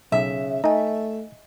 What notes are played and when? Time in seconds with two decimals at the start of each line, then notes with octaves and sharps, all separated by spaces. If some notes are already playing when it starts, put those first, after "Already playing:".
0.12 B1 C#3 E5
0.64 A3 D#4 D#5 G#5